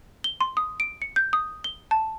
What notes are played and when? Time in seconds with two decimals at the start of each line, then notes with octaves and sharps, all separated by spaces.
0.24 G7
0.41 C6
0.57 D#6
0.80 D7
1.02 C#7
1.16 G6
1.33 D#6
1.64 G7
1.91 A5